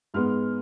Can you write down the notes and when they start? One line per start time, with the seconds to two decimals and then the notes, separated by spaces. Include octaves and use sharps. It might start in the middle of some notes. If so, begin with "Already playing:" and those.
0.14 G#2 G#3 B3 F6